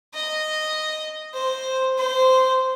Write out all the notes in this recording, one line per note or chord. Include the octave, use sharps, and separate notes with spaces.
D#5
C5
C5